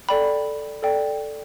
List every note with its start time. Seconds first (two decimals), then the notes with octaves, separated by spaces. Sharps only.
0.09 A4 D5 G5 B5
0.82 A4 D5 G5